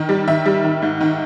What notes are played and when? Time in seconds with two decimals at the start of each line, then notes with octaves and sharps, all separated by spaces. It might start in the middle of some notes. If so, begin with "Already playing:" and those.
Already playing: D#3
0.09 G3
0.28 D#3 E5
0.46 G3
0.64 D#3
0.82 G#2
1.01 D#3